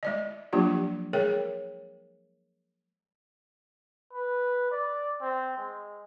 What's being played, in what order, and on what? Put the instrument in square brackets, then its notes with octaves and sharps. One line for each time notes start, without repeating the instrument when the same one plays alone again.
[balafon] G#3 D5 D#5
F3 F#3 A#3 D4 F4 G4
G#3 G#4 A#4 C#5 G5
[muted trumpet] B4
D5
C4
G#3